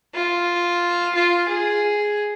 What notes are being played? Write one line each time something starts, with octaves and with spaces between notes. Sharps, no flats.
F4
F4
G#4